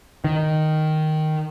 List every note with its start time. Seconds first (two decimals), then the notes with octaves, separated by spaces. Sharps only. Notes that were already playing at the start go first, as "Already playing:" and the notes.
0.24 D#3